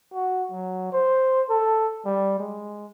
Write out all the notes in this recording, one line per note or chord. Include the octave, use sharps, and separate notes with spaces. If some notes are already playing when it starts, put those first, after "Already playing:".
F#4
F#3
C5
A4
G3
G#3